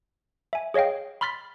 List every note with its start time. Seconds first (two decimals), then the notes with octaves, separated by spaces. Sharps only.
0.53 E5 G#5
0.74 G#4 C#5 D#5 F5 G5
1.21 B5 C6 F6 A6 B6